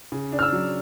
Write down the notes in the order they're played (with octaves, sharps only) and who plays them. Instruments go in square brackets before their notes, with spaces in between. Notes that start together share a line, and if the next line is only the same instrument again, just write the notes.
[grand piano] C#3
D4
[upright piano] F6
E6
[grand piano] F#3